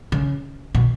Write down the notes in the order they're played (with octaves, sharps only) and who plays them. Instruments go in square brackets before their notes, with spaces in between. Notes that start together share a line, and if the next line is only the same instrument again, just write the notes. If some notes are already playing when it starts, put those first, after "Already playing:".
[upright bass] C#3
B2